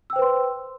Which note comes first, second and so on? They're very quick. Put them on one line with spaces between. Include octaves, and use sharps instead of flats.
E6 G5 C5 B4 C6